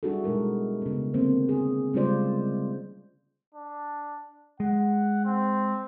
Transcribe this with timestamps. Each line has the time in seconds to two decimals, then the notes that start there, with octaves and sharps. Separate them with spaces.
0.03 G3 D4 E4 F#4 G#4 A4
0.24 B2 G#3 D#4 G#4 A#4
0.82 C#3 B3
1.14 D3 E3 A#3 C4 C5
1.49 G#4
1.94 C#3 G3 G#3 F4 C5 D5
3.55 D4
4.60 G#3 F#5
5.25 C4